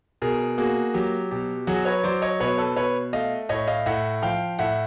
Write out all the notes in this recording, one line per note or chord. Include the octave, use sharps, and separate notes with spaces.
B2 G#4 A#4
A#3 F#4 G#4
F#3 G4
B2 G4
F#3 F#4 G#4
B4 C#5
F#3 C5 D5
C#5 D#5
B2 B4 C#5
A4 B4
B2 B4 C#5
A3 D#5 F5
A2 C#5 D#5
D#5 F5
A2 E5 F#5
F3 F5 G5
A2 E5 F#5